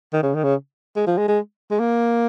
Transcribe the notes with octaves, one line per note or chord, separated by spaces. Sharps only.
D#3
C#3
D#3
C#3
G#3
F3
G#3
G#3
G#3
A#3